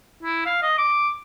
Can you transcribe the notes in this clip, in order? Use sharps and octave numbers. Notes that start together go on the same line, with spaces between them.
E4
F5
D#5
D6